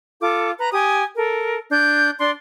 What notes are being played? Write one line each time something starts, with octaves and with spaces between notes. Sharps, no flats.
F4 A4 D6
B4 A#5
G4 G#5 D#6
A4 A#4
D4 G6
D4 D5 C6